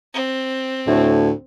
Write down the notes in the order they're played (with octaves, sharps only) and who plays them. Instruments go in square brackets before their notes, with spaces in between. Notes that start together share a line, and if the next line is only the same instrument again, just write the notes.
[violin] C4
[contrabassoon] D2 [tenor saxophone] A2